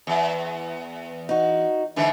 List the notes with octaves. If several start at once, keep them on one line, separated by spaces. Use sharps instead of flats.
E2
D#4 F#4
G#2 D3 E3